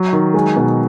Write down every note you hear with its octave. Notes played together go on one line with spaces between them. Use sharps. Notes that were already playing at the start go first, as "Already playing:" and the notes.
Already playing: F#3
D#3
G#3
B2